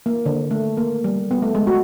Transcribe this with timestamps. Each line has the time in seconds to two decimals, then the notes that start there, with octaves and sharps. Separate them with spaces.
0.06 A#3
0.26 D3
0.51 A3
0.77 A#3
1.04 G3
1.31 B3
1.42 A3
1.55 G#3
1.67 F#4